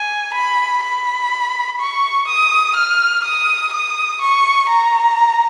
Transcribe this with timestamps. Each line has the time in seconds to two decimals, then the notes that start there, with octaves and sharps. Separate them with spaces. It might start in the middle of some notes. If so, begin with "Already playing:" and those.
Already playing: G#5
0.34 B5
0.83 B5
1.79 C#6
2.28 D#6
2.76 F6
3.24 D#6
3.73 D#6
4.21 C#6
4.69 A#5